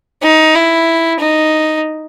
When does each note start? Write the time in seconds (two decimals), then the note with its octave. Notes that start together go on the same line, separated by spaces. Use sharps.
0.23 D#4
0.54 E4
1.20 D#4